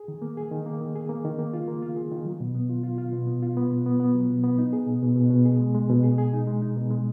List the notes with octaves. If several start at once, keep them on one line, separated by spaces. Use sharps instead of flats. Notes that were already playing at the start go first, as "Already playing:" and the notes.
Already playing: G#4
D#3
A#3
G#4
D#3
A#3
D#3
G#4
A#3
D#3
A#3
F4
A#3
F4
G#4
D#3
F#3
B2
B3
F4
F4
F4
B2
B3
F4
B3
B2
B3
B3
F#3
B2
B3
D#4
G#4
B2
B2
B2
B2
G#4
G#3
G#3
B2
G#4
G#4
D#4
G#3
D#4
B2
G#3